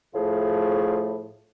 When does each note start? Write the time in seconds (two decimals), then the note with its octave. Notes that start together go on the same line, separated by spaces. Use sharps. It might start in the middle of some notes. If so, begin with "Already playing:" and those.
0.14 A2 F3 A3 G#4